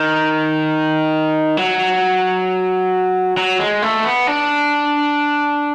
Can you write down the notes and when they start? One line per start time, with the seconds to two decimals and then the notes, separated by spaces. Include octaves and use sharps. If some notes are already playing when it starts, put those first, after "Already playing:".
Already playing: D#3
1.57 F#3
3.37 F#3
3.59 G#3
3.82 A3
4.05 B3
4.27 D4